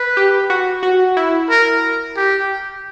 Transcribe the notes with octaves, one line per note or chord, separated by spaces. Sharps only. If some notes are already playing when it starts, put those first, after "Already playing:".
Already playing: B4
G4
F#4
F#4
E4
A#4
G4